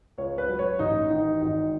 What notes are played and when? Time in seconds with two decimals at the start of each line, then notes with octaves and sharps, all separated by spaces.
0.18 C#2 C#5
0.38 B4
0.49 F#3
0.59 C#5
0.79 A1 D#4
1.10 D#3 D#4
1.41 G#1 D#4